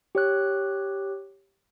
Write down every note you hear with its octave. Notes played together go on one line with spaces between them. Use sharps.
G4 C#5 F#6